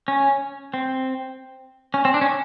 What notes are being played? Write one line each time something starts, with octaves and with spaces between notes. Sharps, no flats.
C#4
C4
C#4
C4
D4
C#4